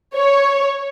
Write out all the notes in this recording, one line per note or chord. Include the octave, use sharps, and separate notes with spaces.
C#5